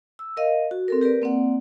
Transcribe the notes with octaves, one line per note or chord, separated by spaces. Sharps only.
E6
A#4 D#5 F5
F#4
C4 A4 A#4
G4 A#4 B4 D5
A#3 C4 D5 F#5